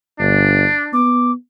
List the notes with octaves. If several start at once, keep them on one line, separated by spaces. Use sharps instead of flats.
G1 D4
B3 D6